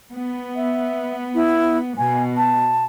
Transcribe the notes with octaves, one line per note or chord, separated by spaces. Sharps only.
B3
E5
E4
B2 G#5
A5